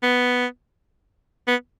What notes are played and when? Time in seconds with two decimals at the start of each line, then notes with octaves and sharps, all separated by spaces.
0.03 B3
1.48 B3